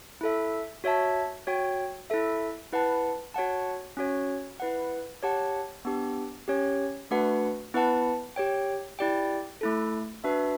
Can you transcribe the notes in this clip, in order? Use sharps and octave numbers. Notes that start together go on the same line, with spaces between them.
E4 A4 E5
F#4 C#5 E5 A5
F#4 C#5 G5
E4 A4 E5
E4 B4 F#5 A5
F#4 C#5 F#5 A5
C#4 F#4 C#5
E4 B4 F#5
G4 C#5 F#5 A5
B3 D4 G4
C#4 G4 C#5
A3 D4 F#4 B4 F#5
B3 E4 B4 F#5 A5
G4 C#5 G5
E4 G4 D5 G5
A3 E4 A4
D4 F#4 B4 E5